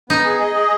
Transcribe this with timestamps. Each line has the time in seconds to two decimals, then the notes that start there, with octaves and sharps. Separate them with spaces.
0.09 B3 D#4
0.24 G#4
0.40 D#5
0.55 G#4